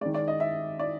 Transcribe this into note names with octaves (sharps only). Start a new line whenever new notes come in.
D#3 G#3 D5
D5
D#5
E5
D5